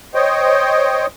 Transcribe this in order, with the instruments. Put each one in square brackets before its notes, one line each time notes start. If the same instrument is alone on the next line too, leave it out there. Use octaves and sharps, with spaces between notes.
[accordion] C5 C#5 D#5 G5